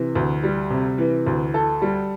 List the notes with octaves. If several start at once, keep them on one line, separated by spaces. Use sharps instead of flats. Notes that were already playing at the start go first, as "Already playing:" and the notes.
Already playing: C3 E3
D2
G3
C3
E3
D2
A4
G3